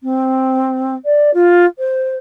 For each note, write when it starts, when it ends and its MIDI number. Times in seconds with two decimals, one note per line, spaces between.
0.03 0.94 60
1.05 1.31 74
1.34 1.65 65
1.78 2.15 72